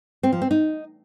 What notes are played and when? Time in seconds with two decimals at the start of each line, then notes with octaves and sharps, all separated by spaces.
0.23 C4
0.32 F3
0.42 C4
0.51 D#4